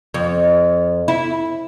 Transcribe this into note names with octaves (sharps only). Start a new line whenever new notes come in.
F2
E4